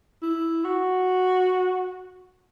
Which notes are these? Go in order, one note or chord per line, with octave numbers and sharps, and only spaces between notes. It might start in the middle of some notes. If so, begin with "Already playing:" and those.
E4
F#4